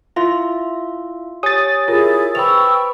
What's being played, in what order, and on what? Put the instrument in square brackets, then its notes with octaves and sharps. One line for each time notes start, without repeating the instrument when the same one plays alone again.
[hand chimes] E4 E5 F5 [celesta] F4 C6
[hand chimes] G4 C#5 G#5 [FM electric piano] D#6 A6
[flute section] E4 G#4 [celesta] F4 A#4
[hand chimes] B4 C5 B5 [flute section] G5 C#6 E6 [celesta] F7